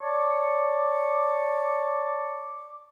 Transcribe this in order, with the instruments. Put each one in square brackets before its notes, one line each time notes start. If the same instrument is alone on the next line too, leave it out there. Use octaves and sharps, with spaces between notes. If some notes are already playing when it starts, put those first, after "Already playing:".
[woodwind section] C#5 D5 A5 C#6 D6